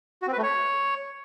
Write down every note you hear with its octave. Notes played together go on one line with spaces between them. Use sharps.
F#4
C4
B4
A3
C#5